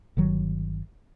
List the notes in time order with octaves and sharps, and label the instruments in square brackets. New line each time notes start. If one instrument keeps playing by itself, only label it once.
[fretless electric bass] G1 D#3 F#3